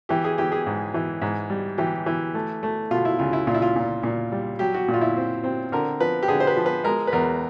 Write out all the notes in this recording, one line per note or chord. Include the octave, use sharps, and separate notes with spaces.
E3 G4
G#4
E3 G4
G#4
G#2
E3
G#2
G3
E3 G4
E3
A3
A3
B2 F4
E4
C#2 F4
E4
A#2 F4
E4
F4
A#2
A#2
G3
F#3 G4
F#4
A#2
F4
E4
C4
C4
D3 A#4
F3 B4
G4
D3 G#4
C5
B4
F3
B4
G#3 A#4
B4
E2 A#4